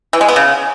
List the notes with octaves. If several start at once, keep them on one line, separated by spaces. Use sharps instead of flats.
E3
G#3
B3
C#3